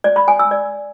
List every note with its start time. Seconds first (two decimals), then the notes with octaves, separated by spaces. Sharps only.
0.04 D5
0.16 B5
0.28 G#5
0.39 E6
0.51 D5